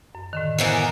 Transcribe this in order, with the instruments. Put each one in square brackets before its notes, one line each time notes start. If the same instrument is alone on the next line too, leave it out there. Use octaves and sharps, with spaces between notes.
[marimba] F#2
A2 D3 D#3
[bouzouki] E3 A#3 B3 [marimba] C5 G#5